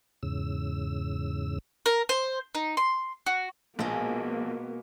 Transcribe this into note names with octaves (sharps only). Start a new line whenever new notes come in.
E2 G#2 C#3 E6
A#4
C5
D#4
C6
F#4
A#1 B2 G#3 A#3 B3